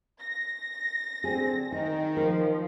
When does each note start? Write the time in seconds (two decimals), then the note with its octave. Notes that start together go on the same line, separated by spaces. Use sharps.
0.20 A#6
1.24 D3 C4 G#4
1.72 D#3 D#4
2.17 F3 A#4